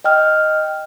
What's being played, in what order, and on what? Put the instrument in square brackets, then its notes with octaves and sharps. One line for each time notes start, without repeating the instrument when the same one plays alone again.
[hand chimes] D#5 G5 F6